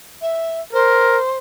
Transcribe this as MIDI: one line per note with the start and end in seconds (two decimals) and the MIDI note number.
0.21 0.60 76
0.73 1.18 70
0.73 1.38 72